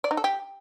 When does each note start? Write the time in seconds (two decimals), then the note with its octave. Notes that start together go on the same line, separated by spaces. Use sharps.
0.04 D5
0.11 D#4
0.17 A4
0.24 G4